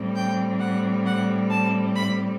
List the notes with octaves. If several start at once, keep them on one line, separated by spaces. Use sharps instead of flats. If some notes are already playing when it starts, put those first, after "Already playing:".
Already playing: A2 G3 C4
G5
F#5
F#5
A5
B5